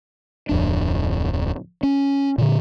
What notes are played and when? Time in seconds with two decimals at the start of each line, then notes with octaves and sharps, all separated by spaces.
0.49 D1 F2 D4
1.83 C#4
2.38 A#2 D3